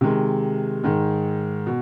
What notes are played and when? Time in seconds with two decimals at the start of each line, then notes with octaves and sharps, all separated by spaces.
0.01 C3 D#3 G#3
0.84 G#2 D#3 G#3
1.67 B2